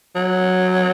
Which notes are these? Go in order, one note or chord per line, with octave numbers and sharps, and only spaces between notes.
F#3